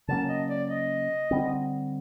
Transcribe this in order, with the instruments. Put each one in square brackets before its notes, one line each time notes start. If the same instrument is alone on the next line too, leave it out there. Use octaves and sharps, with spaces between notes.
[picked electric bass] C#3 F#3 A#3 C#4 [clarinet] A5
[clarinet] D#5
D5
D#5
[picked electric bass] D3 G3 C4